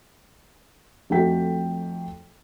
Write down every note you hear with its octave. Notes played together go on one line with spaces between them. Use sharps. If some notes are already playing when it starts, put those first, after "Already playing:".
F2 A3 D#4 F#4 G5 B6